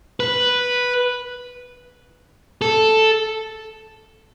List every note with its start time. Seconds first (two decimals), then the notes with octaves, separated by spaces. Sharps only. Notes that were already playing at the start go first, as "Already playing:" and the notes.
0.20 B4
2.62 A4